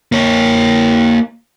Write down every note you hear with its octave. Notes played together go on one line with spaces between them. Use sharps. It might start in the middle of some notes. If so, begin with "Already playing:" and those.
A#3 C#5